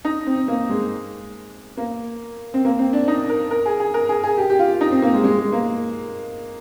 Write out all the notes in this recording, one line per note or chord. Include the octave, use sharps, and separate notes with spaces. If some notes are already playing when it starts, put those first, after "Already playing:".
D#4
C4
A#3
G#3
A#3
C4
A#3
C4
D4
D#4
A#4
A#4
G#4
G#4
A#4
G#4
G#4
G4
G4
F4
D#4
C4
A#3
G#3
G#3
G#3
A#3